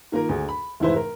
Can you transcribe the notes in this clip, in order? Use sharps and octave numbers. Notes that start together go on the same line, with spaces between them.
D#3 A#3 F4 A#4
D2 G#4
B5
F1 G#2 E3 E4 B4 C5
A#4